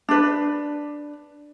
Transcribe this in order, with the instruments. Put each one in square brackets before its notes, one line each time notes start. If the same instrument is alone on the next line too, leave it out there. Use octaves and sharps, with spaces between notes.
[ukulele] D4 B4